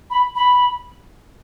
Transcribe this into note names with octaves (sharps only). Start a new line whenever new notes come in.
B5
B5